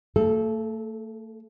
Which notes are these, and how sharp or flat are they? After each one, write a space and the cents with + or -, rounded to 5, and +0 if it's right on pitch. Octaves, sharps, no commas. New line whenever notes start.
A3 +35 A4 -20